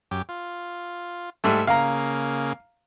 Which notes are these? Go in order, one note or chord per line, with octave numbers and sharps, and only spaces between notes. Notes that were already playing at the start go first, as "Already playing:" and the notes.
F#2 G4
F4
G#2 G3 A3 E5
C#3 A#3 F5 A#5